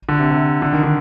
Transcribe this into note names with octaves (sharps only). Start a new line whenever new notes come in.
D3
C3
C3
D3
D#3
D3